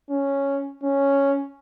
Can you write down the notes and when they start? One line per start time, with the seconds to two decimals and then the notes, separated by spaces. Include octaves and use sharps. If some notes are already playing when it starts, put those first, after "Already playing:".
0.10 C#4
0.83 C#4